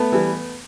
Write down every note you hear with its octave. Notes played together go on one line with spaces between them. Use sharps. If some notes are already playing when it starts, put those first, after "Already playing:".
Already playing: A3 B3
E3 G3